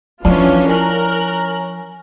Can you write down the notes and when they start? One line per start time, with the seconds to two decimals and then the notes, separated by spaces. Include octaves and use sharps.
0.25 E3 F3 C#4 D4 E4 F4
0.69 C#4 A#4 A#5 F#6